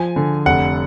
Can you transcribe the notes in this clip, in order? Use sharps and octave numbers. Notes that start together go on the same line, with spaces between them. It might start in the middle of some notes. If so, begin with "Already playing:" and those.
Already playing: F3 G#5
D3
F1 F#5